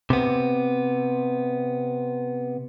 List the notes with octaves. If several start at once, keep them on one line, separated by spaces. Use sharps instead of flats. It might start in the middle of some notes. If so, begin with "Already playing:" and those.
C3 B3